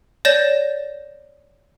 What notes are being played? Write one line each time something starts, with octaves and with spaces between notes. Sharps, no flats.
C#5 D5 G6 A6 A#6 E7